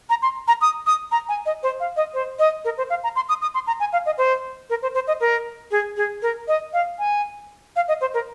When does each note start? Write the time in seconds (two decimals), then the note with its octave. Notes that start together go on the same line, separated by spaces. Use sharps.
0.09 A#5
0.22 C6
0.48 A#5
0.61 D#6
0.86 D#6
1.11 A#5
1.28 G#5
1.46 D#5
1.63 C5
1.80 F5
1.96 D#5
2.14 C5
2.39 D#5
2.65 A#4
2.78 C5
2.90 F5
3.03 A#5
3.15 C6
3.29 D#6
3.42 D#6
3.54 C6
3.67 A#5
3.80 G#5
3.93 F5
4.06 D#5
4.18 C5
4.70 A#4
4.82 C5
4.94 C5
5.07 D#5
5.20 A#4
5.71 G#4
5.97 G#4
6.22 A#4
6.48 D#5
6.73 F5
6.99 G#5
7.76 F5
7.88 D#5
8.01 C5
8.14 A#4